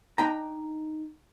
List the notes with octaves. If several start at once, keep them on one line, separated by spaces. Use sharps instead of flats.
D4 D#4 G5 A#5